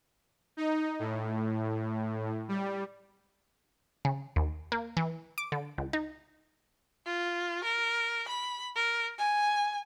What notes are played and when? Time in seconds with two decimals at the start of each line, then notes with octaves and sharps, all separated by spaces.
0.57 D#4
0.99 A2
2.48 G3
4.05 C#3
4.36 D#2
4.72 A#3
4.97 E3
5.38 D6
5.52 D3
5.78 C#2
5.93 D#4
7.06 F4
7.64 A#4
8.28 B5
8.76 A#4
9.19 G#5